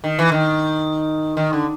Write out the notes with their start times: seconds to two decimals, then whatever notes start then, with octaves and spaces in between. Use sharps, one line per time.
0.04 D#3
0.19 E3
0.32 D#3
1.37 D#3
1.53 D3